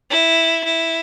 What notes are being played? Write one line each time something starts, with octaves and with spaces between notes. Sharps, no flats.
E4
E4